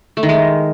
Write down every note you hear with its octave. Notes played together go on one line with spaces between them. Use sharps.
A3
D#3
G#3